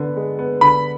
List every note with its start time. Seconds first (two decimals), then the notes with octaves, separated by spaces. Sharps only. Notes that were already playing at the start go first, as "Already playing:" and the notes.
Already playing: D3 B3
0.16 G#3
0.39 B3
0.61 D3 B5